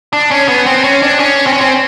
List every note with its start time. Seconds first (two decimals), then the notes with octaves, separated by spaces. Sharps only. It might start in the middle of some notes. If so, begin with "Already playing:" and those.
0.13 D4
0.31 C#4
0.48 B3
0.66 C4
0.84 C#4
1.02 D4
1.20 C#4
1.47 C4
1.53 C#4
1.61 C4